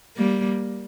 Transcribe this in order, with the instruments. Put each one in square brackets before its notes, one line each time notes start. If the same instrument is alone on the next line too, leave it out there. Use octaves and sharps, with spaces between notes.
[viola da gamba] G3 A#3